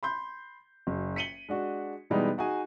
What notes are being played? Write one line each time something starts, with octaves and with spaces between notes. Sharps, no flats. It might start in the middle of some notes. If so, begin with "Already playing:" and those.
B5 C6 G6
F#1
B6 C#7 D#7 F#7 G7
G#3 D4 F#4
B2 E3 G3 G#3 B3 D#4
D#4 F#4 G#4 G#5